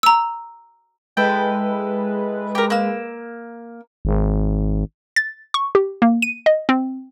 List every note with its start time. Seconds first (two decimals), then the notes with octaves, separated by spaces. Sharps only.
0.03 A#5 E6
1.17 G#3 E4 A4 B4 G5
2.55 G4 A#4
2.70 A#3 E6
4.05 G#1
5.16 A6
5.54 C#6
5.75 G4
6.02 A#3
6.22 D#7
6.46 D#5
6.69 C4